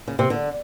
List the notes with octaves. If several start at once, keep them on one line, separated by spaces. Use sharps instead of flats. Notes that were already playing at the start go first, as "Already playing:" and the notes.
C#3
C3
D3